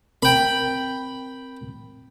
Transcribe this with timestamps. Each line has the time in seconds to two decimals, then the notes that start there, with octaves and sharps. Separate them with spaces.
0.22 C4 A#4 G5 B5